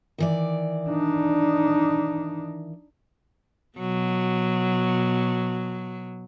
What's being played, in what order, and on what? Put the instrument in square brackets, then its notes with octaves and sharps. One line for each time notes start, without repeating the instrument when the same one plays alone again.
[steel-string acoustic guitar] D#3 E3 D5
[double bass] D4 D#4
[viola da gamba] B2 F#3